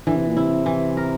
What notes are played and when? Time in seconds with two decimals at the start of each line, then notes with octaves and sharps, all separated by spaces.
0.07 D3 E3
0.16 C3
0.27 A#2
0.37 C3 E4
0.66 E3
0.97 A#4